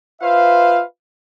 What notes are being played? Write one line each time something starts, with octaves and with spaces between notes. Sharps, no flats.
F4 B4 C5 E5 F5